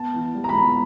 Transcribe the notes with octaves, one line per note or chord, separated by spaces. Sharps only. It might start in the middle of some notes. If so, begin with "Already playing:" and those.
Already playing: B3 A5
E3
G3
A#5
B5
B3